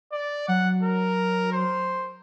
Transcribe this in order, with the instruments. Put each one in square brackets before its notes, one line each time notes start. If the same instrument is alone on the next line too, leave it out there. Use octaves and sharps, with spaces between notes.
[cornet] D5
[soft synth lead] F#3 [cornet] F#5
[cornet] A#4
C5